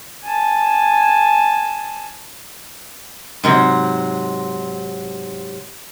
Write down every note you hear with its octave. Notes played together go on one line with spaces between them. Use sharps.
G#5 A5
G#2 C3 F#3